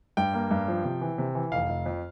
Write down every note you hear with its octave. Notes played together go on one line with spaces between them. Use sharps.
G2 G5
A#3
G2
F3
C3
E3
C3
E3
F1 F5
F1
F2